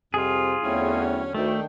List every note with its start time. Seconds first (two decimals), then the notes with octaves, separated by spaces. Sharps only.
0.14 F2 C3 G3 F4 G#4
0.62 E2 D3 F#3 A3 C4 C#4 E4
1.34 D2 D#3 A3 D4 G5